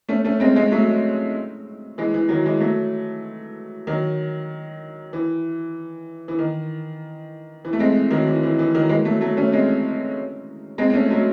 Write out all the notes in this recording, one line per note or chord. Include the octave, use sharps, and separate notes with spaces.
A3 C#4
A3 C#4
G#3 C4
G#3 C4
F#3 A3
E3 G#3
E3
D#3 F#3
E3 G#3
F#3 A3
D#3 F#3
E3
E3
D#3
E3
A3
G#3 C4
D#3 F#3
E3
E3
E3
D#3 F#3
E3 G#3
F#3 A3
F#3 A3
A3 C#4
G#3 C4
G#3 C4
C4
A3 C#4
F#3 A3